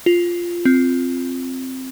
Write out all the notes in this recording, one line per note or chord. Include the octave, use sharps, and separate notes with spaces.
F4
C4